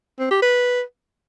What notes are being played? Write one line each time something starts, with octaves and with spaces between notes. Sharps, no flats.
C4
G4
B4